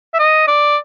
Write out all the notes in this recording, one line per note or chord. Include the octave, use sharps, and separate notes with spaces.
E5
D#5
D5